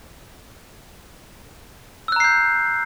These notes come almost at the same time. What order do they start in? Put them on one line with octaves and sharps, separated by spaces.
E6 F#6 A#5 C7 G6